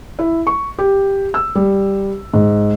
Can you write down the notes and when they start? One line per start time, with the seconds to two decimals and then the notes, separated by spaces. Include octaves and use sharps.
0.19 E4
0.47 C#6
0.79 G4
1.34 E6
1.55 G3
2.34 G#2